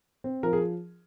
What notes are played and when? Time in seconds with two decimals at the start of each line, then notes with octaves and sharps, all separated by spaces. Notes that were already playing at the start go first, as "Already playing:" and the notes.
0.24 C4
0.43 F3 A#4
0.53 G#4